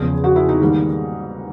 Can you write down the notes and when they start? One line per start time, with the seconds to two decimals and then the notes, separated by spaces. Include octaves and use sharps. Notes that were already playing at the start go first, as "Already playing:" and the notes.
Already playing: E2 C#3 F3 G#4
0.24 F#4
0.36 E4
0.49 D#4
0.61 G#2 D#3 G3 A#3